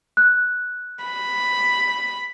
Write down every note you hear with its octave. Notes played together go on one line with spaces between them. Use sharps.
F#6
B5